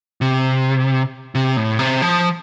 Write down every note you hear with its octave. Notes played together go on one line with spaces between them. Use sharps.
C3
C3
A2
C3
F3